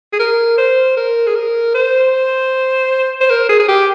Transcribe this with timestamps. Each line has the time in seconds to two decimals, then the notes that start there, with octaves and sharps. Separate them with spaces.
0.13 G#4
0.19 A#4
0.58 C5
0.97 A#4
1.27 G#4
1.35 A#4
1.74 C5
3.21 C5
3.30 A#4
3.49 G#4
3.60 G#4
3.68 G4